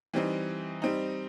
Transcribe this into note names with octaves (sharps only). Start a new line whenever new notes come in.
E3 G3 C4 D#4
G3 C4 D#4